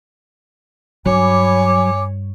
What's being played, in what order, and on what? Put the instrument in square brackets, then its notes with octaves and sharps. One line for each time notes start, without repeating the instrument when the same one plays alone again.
[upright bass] G2 [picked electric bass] F#3 [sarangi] C#5 [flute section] G#5 B5 D6